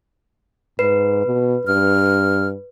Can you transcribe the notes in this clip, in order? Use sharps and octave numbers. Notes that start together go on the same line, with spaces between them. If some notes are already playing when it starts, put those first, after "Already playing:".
G#2 B4
B2
G2 F6